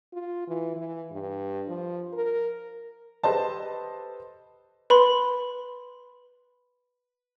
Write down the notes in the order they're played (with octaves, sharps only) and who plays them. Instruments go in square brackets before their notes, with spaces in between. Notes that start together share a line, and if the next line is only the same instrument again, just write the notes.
[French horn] F4
E3
E3
G2
F3
A#4
[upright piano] G4 A4 B4 C5 D#5 A5
[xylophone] B4 B5 C6